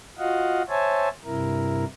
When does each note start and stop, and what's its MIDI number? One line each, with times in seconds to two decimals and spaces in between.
0.18 0.62 65
0.18 0.62 66
0.18 0.62 75
0.18 0.62 77
0.18 0.62 78
0.69 1.09 72
0.69 1.09 73
0.69 1.09 76
0.69 1.09 80
0.69 1.09 81
1.25 1.85 43
1.25 1.85 48
1.25 1.85 64
1.25 1.85 70